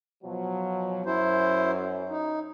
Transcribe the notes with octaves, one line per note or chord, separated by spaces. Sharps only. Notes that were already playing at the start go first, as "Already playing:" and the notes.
B2 F3 F#3
F#2 E4 C5
D#4